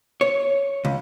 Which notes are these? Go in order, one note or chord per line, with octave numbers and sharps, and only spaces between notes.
C#5
C#2